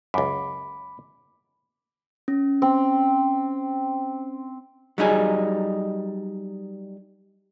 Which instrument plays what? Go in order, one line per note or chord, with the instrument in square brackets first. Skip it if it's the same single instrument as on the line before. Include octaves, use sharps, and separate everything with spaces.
[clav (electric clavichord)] C#2 F#2 [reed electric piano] B5 D6
[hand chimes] C#4
[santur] C4
[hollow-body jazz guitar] F#3 G3 D#4 G#4